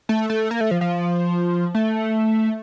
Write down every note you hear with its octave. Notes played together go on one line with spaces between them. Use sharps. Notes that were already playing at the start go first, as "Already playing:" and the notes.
A3
A3
A#3
A3
F3
F3
A3